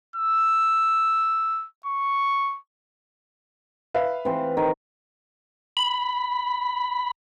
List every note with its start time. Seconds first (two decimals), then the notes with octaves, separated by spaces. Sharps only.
0.16 E6
1.86 C#6
3.94 B4 E5 F5
4.25 E3 C4
4.57 D#3
5.77 B5